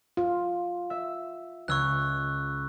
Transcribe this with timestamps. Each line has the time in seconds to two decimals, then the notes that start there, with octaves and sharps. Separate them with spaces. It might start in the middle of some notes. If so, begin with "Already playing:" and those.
0.17 F4
0.90 E5
1.68 C#2 C#6 E6 F#6 G#6